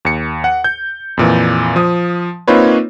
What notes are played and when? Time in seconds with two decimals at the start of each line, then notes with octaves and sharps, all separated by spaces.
0.05 D#2 C#7
0.44 F#5
0.64 G6
1.17 F2 A#2 E3
1.76 F3 D#6
2.48 A#3 C4 D#4 F4 B4 C#5